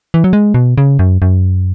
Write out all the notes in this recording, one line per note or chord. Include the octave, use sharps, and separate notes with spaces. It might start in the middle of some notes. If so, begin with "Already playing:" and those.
E3
F#3
G#3
B2
C#3
F#2
F#2